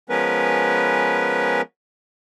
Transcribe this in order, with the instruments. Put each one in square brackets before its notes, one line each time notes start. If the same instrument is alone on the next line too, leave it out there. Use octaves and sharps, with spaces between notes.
[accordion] F3 G#3 B3 C#4 A#4 B4